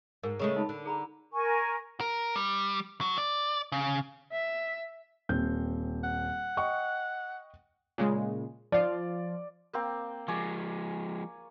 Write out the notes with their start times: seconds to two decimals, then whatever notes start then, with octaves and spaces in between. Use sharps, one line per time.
0.23 G#2 A#4
0.39 C#3 G#3 A3
0.56 D#4 A5 B5
0.69 D3
0.86 G#4 A#5 B5
1.33 A#4 G#5 C#6
2.00 A#4
2.36 G3
3.01 F#3
3.18 D5
3.72 C#3
4.32 E5
5.29 D#1 C4 G6
6.04 F#5
6.57 D#5 G5 C#6
7.98 A#2 C#3 G#3
8.72 F3 F4 D5
9.73 A#3 C4 G5
10.28 F3 G#3 C#5 D5 G#5